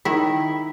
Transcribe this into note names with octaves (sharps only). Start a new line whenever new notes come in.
D#3 E4